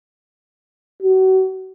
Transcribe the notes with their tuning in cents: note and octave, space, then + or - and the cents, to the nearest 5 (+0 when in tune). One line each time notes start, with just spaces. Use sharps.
F#4 +35